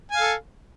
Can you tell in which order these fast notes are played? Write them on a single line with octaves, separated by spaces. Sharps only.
G#5 F5 A4